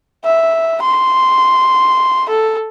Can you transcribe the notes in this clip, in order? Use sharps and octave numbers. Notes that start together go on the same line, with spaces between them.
E5
C6
A4